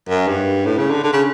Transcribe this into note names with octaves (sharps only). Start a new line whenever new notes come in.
F#2
G2
A2
C#3
D3
D3
C#3